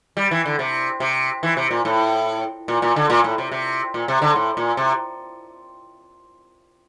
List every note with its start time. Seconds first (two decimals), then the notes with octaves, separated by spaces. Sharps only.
0.17 G3
0.31 E3
0.46 D3
0.59 C3
1.00 C3
1.43 E3
1.57 C3
1.71 A#2
1.85 A2
2.68 A#2
2.82 A#2
2.96 D3
3.10 A#2
3.24 A2
3.38 C3
3.52 C3
3.94 A#2
4.08 C3
4.22 D3
4.35 A2
4.57 A#2
4.77 C3